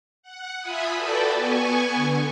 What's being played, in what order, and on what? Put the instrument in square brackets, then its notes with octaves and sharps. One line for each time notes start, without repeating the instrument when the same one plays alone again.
[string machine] F#5
F4 E5 G#5 B5 D#6
F#4 A4 B4 D5 G5 A5
B3 G#5 C#6
D3